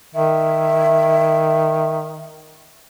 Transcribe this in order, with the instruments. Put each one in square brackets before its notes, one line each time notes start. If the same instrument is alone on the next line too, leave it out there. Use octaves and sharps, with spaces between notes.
[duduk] D#3 [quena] E5